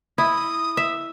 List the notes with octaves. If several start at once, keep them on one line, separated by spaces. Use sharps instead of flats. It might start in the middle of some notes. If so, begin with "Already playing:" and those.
E4 D#6
E5